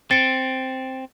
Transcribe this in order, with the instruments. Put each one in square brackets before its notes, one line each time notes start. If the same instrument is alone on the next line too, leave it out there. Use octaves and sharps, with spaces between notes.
[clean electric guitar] C4 [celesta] A6 C#7 D7